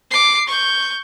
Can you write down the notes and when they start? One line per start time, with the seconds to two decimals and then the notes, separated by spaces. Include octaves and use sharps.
0.11 D6 C7
0.48 C#6 G6